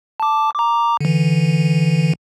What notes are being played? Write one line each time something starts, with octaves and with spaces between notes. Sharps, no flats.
A5 D6
A#5 D6
D3 E3